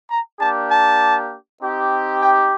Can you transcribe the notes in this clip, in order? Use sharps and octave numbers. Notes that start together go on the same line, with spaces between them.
A#5
A#3 D4 G4 A5
A5
C4 D#4 G4
G5